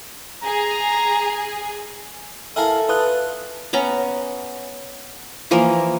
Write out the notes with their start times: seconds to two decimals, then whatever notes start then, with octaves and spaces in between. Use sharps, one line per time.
0.44 G#4 A#5
2.56 E4 A4 A#4 E5 F5 G#5 A5
2.89 F4 B4 D#6 F#6
3.73 B3 C#4 A#5
5.51 E3 F3 A#3 A#4